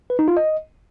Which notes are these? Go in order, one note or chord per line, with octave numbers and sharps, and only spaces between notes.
B4
D#4
F4
D#5